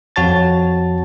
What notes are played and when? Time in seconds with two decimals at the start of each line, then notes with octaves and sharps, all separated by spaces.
0.16 F2 F#4 C#5 A5 A6